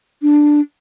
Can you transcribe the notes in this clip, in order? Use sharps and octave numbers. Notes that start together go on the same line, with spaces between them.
D4